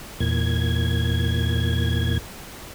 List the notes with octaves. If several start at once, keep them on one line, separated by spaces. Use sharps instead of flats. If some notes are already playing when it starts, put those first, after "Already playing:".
E2 A#2 G#6